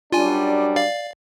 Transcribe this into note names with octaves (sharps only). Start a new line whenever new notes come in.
F#2 G3 D4 F4 G#5
D5 F5